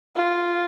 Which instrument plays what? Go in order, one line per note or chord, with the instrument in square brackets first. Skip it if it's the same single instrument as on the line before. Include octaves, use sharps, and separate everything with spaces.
[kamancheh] F4